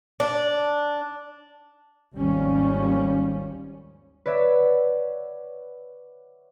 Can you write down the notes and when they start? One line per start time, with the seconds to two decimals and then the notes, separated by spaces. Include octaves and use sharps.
0.20 D4
2.15 G#1 D#2 F3 G3 C#4
4.26 B4 C#5 D5 E5 F#5